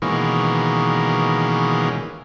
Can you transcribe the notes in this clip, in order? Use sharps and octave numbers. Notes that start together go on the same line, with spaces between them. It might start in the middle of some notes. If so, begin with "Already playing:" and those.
B2 D#3 E3 G#3 A#3 C#4